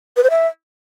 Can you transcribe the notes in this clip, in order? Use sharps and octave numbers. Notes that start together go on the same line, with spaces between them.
B4
C5
E5